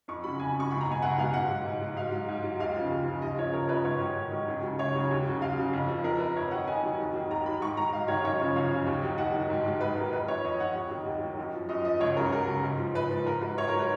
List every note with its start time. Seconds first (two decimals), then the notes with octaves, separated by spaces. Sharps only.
0.08 F2 C#6
0.24 C#3 F#3 B5
0.39 F2 G#5
0.55 C#3 F#3 C#6
0.70 C#2 B5
0.81 A#5
0.87 B2 F#3 G#5
1.02 C#2 F#5
1.18 B2 F5
1.23 F#3
1.34 G#2 F#5
1.49 F#3
1.65 G#2
1.81 F#3
1.96 G#2 F5
2.12 F#3
2.28 G#2
2.44 F#3
2.60 D#2 F5
2.76 C#3 F3
2.91 D#2
3.07 C#3 F3
3.22 D#2 D#5
3.38 C#3 F3 C#5
3.53 D#2 A#4
3.69 C#3 F3 B4
3.84 G#2 C#5
4.01 D#3 F#3
4.16 G#2
4.32 D#3 F#3
4.48 C#2
4.63 C#3 F#3
4.79 C#2 C#5
4.95 C#3 F#3
5.11 D#2
5.27 C#3 F#3
5.42 D#2 F5
5.58 C#3 F#3
5.73 F2
5.88 F3
6.04 F2 A#4
6.20 F3 B4
6.36 F2 C#5
6.51 D#3 F#3 F#5
6.67 F2 G#5
6.83 D#3 F#3
6.99 D#2
7.14 D#3 F#3
7.30 D#2 A#5
7.46 D#3 F#3 B5
7.61 G#2 C#6
7.77 D#3 F#3 A#5
7.92 G#2 F5
8.08 D#3 F#3 C#5
8.24 F#2 C#5
8.40 C#3 F3 C#5
8.56 F#2 F5
8.71 C#3 F3
8.87 D#2
9.02 D#3 F#3
9.18 D#2 F#5
9.34 D#3 F#3
9.50 G#2
9.66 D#3 F#3
9.81 G#2 B4
9.96 D#3 F#3 A#4
10.13 F2 B4
10.28 F3 C#5
10.44 F2 D#5
10.60 F3 F#5
10.75 D#2
10.91 D#3 F#3
11.06 D#2
11.23 D#3 F#3
11.39 F#2
11.54 F3
11.69 F#2 D#5
11.85 F3 D#5
12.00 C#2 C#5
12.17 C#3 F#3 A#4
12.32 C#2 A#4
12.47 C#3 F#3
12.63 G#2
12.79 F3
12.95 G#2 B4
13.10 F3
13.26 G#2 A#4
13.42 F#3 B4
13.57 G#2 C#5
13.68 A#4
13.74 F#3 B4